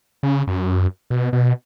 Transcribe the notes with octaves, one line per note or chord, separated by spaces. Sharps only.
C#3
F#2
B2
B2